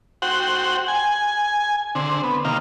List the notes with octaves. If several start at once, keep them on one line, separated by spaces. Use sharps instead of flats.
F#4 C5 F#5 G5
G#5
D3 C4
B3
C3 D#3 A#3 F5